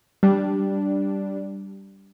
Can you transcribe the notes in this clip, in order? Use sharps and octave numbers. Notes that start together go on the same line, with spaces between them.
G3 D4